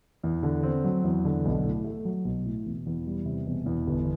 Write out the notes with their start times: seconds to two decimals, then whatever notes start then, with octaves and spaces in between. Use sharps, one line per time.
0.24 E2
0.43 D3
0.63 C4
0.84 F#3
1.04 E2
1.25 D3
1.45 B1
1.65 A2
1.84 A3
2.05 F#3
2.25 B1
2.45 A2
2.66 E1
2.86 E2
3.07 G3
3.25 C3
3.46 E1
3.66 E2
3.87 G1